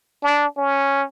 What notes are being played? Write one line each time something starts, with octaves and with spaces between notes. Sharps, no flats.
D4
C#4